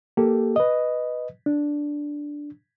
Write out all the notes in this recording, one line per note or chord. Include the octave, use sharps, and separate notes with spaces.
A#3 G4 A4
B4 D#5
D4